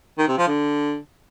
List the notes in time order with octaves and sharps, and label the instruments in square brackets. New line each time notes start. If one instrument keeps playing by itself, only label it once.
[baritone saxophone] D#3
C3
F3
D3